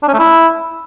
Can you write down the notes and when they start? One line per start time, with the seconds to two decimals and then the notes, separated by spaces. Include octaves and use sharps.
0.03 D4
0.08 C#4
0.14 A3
0.19 E4